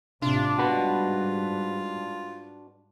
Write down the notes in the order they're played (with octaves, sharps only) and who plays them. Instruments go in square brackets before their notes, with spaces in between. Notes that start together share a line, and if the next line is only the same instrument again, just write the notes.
[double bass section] A1 C3 [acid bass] D4 [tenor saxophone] F4
[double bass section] G#2 G3 [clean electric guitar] F#4 B4